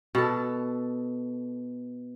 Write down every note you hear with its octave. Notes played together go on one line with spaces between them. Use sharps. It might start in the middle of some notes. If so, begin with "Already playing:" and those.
B2 A4